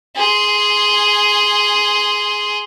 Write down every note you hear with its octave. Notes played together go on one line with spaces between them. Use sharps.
G#4 C6